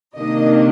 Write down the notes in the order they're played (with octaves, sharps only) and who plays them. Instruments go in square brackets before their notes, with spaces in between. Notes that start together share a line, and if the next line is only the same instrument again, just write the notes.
[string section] C3 D#3 A#3 D4 D#5